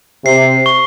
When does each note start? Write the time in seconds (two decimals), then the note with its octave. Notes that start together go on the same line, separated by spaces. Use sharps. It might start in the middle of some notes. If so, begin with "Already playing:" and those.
0.25 C3 C7
0.66 C#6